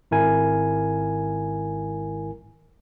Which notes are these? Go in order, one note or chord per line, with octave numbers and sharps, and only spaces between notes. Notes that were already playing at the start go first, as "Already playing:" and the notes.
G#1 E4 A#4 G#5